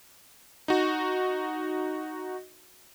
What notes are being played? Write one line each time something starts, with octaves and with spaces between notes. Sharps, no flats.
D#4 F#4